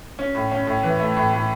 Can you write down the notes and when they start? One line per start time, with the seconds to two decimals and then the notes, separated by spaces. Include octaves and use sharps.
0.19 C#4
0.35 A2
0.52 C#4
0.67 A2
0.83 E3
1.00 A3
1.17 A2
1.33 A2